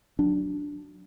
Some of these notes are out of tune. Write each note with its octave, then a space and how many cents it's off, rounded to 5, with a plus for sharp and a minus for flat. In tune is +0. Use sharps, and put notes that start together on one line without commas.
F#3 +0 D4 +0